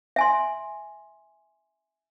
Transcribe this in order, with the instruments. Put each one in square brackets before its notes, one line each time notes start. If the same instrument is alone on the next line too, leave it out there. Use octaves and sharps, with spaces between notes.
[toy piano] E5 G#5 C6